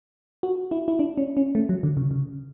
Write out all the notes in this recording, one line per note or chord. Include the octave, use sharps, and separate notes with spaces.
F#4
E4
E4
D4
C#4
C#4
A3
F#3
D3
C#3
C#3